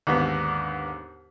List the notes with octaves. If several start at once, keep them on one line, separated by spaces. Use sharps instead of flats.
D#2 G#2 D3 B3